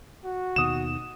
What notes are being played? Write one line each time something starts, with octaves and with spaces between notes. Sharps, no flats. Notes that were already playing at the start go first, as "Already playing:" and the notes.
F#4
D#2 B2 D#3 D#6 E7